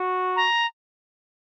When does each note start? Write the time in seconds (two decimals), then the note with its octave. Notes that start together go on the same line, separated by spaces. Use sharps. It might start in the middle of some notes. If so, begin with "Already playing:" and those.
Already playing: F#4
0.36 A#5